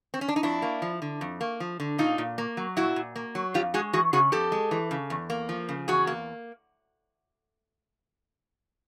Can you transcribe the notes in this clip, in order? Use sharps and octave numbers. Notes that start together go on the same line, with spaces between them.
C4
C#4
D4
D#4
F2 D4 E4
A#3
F3
D3
F2
A#3
F3
D3
A#2 D#4 F4
A#2
A#3
F#3
A#2 E4 F#4
A#2
A#3
F#3
F2 F4 G4
G#3 F#4 G#4
E3 F#4 G#4
C#3 F#4 G#4
F2 G4 A4
G#3
E3
C#3
E2
A#3
F3
C#3
E2 F#4 G#4
A#3